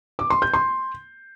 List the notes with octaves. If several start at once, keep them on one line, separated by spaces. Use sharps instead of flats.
D6
C6
G6
C6